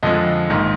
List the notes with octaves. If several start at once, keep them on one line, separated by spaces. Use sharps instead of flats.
F2 D3 F3 G#3 D#5
A#1 G#2 D#3